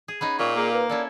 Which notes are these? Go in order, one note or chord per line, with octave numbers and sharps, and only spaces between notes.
G#4
B3 C#4 D#4 B5
A#2 C4 C#6
A#3 G#4
B4
C#4 E4 A4 D5